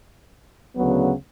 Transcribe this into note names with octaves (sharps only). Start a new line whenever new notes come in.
D2 C#3 F#3 B3